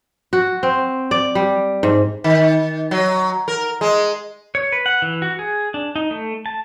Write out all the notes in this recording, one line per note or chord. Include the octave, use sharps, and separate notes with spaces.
F#4
C4
D5
G3
G#2
D#3
F#3
A#4
G#3
C#5
B4
F#5
E3
F#4
G#4
D4
D#4
A3
A5